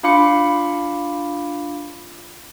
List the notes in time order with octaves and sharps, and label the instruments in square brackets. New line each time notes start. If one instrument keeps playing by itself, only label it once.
[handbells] D4 F4 F5 B5 D6 C#7